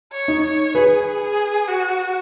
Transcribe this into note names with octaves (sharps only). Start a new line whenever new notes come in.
C#5
D#4
C#5
G#4 B4
G#4
F#4